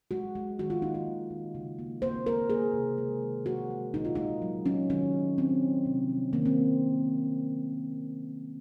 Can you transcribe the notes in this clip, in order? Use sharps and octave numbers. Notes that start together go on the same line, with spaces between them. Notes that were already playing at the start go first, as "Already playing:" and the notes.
G#3 F#4
G#3
D#3 F#4
F4
A#3 D#4
F#4
D#3
D#3
C#3
A#3
A#3 C5
A#3 A#4
A#3 G#4
C3
G#3
D#3
F3 F#4
G#3
A#2 D#4
F4
G#3 D#4
F#3
F#3 C#4
D#3 C#4
G#3
D#3 C4
G#3
C3
F3
D#3 A#3
C4